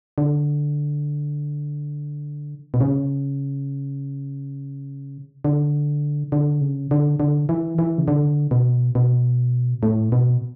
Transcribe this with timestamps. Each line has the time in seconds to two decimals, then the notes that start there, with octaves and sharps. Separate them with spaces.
0.18 D3
2.74 B2
2.81 C#3
5.45 D3
6.32 D3
6.61 C#3
6.91 D3
7.20 D3
7.49 E3
7.79 E3
7.98 C#3
8.08 D3
8.51 B2
8.95 B2
9.83 A2
10.12 B2